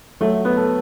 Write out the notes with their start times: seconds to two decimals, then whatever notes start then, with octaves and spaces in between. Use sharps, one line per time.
0.21 F#3 A3
0.45 B3
0.57 A4